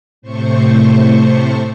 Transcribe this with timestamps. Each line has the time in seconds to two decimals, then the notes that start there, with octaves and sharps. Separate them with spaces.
0.22 A2 C3 A3 C5 C#6